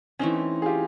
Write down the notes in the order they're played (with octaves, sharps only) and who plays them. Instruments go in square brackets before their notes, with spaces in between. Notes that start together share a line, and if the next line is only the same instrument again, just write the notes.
[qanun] E3 A3 C4 [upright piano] C#4 D#4
[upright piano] G#4
F4 G4